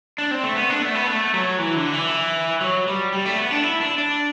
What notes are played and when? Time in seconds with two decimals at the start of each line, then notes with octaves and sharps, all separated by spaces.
0.18 D4
0.31 C4
0.43 A3
0.56 B3
0.70 D4
0.82 A3
0.95 B3
1.07 A3
1.34 F#3
1.58 E3
1.76 D3
1.93 E3
2.61 F#3
2.88 G3
3.13 G3
3.26 A3
3.39 B3
3.51 D4
3.63 E4
3.81 D4
3.98 D4